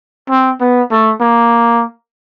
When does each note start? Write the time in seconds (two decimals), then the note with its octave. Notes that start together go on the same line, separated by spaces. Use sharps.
0.30 C4
0.61 B3
0.91 A3
1.21 A#3